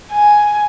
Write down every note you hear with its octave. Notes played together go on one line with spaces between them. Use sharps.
G#5